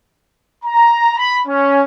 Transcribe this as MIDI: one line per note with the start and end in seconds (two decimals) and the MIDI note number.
0.64 1.13 82
1.17 1.38 83
1.47 1.83 61